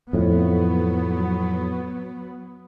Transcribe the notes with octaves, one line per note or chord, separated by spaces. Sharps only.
F2 A2 F#3 B3